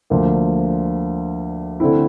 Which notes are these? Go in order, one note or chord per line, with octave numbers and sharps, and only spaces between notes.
D2 D3 F3 A#3
D3 A3 C4 E4